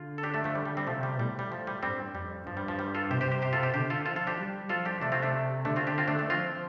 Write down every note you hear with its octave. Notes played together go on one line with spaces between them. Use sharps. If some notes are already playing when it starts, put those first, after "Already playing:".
Already playing: D3 F4
A4
D4 G4
A3 D4
F3 A3
G3
G3
G3 C4
C3 F3 A3
G3
A2 G3
G3
F3
G3
G2 G3 C4
F2 G3
G2 F3
G3
F3
G3
F4 A4
C3 G4 C5
G4 C5
G4 C5
G4 C5
F4 A4
G4 C5
D3 G4 C5
F4 A4
F3 F4 A4
F4 A4
D4 G4
G3
F3 F4 A4
D4 G4
C3 A3 D4
C4 F4
A3 D4
D3 A3 D4
C4 F4
D4 G4
C4 F4
A3 D4
A3 D4
F3 C4 F4